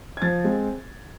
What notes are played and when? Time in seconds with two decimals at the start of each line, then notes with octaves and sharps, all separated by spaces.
0.17 G#6
0.22 F3 A6
0.44 G#3 C4